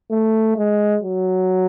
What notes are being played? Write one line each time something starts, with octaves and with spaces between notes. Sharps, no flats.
A3
G#3
F#3